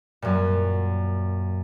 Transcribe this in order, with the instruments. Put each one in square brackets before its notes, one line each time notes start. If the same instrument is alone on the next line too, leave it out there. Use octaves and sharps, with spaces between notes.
[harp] F#2 A#2